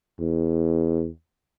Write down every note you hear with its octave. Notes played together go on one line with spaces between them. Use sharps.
E2